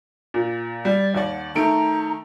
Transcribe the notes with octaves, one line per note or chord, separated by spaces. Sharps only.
A#2
G3 D5
D#2 D5 F#5
D#3 A3 A#5 D7